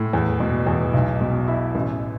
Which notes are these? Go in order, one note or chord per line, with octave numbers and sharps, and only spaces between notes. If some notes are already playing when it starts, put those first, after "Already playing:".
Already playing: A2
E2
B2
E2
B1
B2
E4
A1